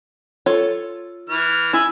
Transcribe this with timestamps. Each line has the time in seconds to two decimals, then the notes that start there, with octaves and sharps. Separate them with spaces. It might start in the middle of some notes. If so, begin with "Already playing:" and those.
0.46 F4 A4 C#5
1.29 E3 F6
1.73 E4 G#5 E6